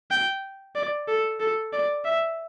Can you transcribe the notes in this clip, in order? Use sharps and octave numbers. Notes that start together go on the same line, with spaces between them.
G5
D5
A4
A4
D5
E5